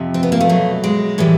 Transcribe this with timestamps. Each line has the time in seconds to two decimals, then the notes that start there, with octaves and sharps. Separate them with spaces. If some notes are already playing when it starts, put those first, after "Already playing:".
Already playing: F2 C3 F3
0.14 C4
0.23 B3
0.32 A#3
0.40 A3
0.49 B2 F#3
0.84 G#3
1.18 A2 E3 G3